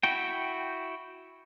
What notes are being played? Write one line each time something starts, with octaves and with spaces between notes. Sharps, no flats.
E4 F#4 G5